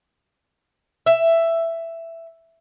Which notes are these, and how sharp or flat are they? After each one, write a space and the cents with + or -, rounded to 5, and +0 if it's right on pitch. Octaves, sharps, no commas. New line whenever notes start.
E5 +10